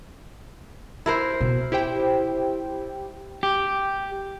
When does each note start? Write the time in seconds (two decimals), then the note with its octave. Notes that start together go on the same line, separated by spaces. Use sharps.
1.06 E4 A#4 C5
1.41 B2
1.72 E4 G4 C5 G5
3.43 G4